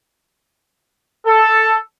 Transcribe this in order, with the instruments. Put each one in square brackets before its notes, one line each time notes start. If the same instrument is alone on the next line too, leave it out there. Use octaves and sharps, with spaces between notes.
[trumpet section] A4